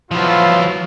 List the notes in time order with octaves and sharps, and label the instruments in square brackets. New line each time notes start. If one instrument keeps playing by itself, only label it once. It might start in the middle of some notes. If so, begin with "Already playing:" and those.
[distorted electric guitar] F3 F#3 [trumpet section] B3 E4 F4